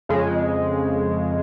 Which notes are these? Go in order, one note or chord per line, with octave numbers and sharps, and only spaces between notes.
F2 C#3 G#3